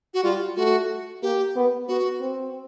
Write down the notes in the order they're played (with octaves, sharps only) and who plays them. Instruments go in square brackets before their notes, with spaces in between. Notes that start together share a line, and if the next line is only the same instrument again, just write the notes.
[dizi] F#4
[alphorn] G3 [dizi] F4
[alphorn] A3 [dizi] F#4
[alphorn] A#3 [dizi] G4
[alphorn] B3
[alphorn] B3 [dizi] F#4
[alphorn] C4